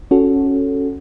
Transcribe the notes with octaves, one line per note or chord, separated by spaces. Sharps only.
C#4 F#4 A4